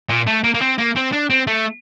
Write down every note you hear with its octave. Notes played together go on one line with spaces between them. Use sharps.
A#2
A3
A#3
A#3
C4
A#3
C4
D4
C4
A3